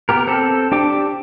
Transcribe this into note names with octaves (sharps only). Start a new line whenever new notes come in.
B3 G4 A#4
C4 A4
D4 G4 G5 D6